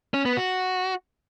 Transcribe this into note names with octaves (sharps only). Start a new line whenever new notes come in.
C#4
B3
F#4